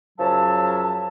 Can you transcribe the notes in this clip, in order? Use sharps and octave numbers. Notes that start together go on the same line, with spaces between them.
F#2 C#3 F3 F#3 E5 A5